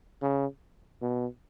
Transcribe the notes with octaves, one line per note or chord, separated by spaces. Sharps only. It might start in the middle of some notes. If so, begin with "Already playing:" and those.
C#3
B2